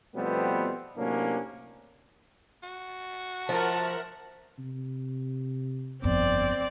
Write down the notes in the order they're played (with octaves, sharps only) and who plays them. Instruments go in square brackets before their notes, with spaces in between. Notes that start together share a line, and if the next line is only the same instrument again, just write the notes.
[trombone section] B2 F3 G3 A3 B3 C4
A2 C3 F#3 A#3 C#4 D4
[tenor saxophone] F#4
[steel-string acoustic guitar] F3 [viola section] A#4 E5 F#5 [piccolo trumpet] A5
[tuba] C3
[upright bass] G1 F2 [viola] C4 D5